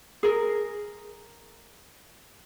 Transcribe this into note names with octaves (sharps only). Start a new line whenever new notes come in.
G#4 A#4